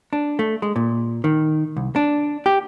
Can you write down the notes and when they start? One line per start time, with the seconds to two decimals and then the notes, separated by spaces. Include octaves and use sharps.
0.13 D4
0.39 A3
0.62 G#3
0.76 A#2
1.24 D#3
1.77 C2
1.96 D4
2.46 G4